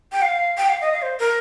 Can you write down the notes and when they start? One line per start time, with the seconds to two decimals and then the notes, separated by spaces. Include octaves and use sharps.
0.12 G5
0.22 F5
0.58 G5
0.69 F5
0.81 D#5
0.93 F5
1.02 C5
1.20 A#4